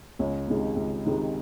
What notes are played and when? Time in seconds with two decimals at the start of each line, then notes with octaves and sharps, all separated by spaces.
0.19 C#2 C#4
0.48 C3 D#3 G#3
0.76 C#2
1.05 C3 D#3 G#3